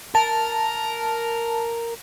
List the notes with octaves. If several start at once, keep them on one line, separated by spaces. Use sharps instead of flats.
A#4 A5